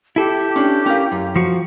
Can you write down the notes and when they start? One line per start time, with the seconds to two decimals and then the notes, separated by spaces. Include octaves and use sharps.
0.16 E4 G4 A4
0.56 C#4 D4
0.86 C#4 A#4 F5
1.12 F#2
1.36 F3 F#4